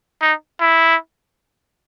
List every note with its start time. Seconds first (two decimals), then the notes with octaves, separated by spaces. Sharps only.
0.22 D#4
0.61 E4